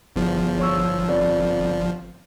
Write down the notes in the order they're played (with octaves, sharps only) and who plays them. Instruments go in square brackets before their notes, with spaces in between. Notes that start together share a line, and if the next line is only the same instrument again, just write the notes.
[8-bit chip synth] G1 F3 [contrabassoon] E2
[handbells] C#5 C#6 E6
[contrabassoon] F2 [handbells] B4 D5